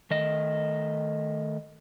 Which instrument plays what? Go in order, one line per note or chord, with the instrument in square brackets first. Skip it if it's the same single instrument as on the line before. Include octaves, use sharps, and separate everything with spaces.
[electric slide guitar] D#3 A3 D#5